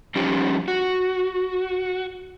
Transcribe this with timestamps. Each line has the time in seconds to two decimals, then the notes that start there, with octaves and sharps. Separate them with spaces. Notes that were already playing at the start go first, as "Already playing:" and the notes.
0.15 F3 G3 C#4 D#4 G4
0.68 F#4